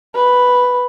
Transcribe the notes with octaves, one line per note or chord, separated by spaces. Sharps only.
B4